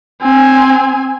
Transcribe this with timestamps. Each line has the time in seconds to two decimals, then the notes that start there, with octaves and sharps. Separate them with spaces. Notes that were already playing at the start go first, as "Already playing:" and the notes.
0.21 C4 G#5